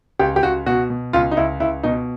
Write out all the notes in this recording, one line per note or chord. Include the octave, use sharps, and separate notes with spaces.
C#2 G4
G4
C#2 F#4
B2 F#4
B2
C#2 F4
D#4
C#2 E4
C#2 E4
B2 D#4